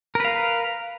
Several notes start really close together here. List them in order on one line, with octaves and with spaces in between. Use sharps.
A#4 B4 F5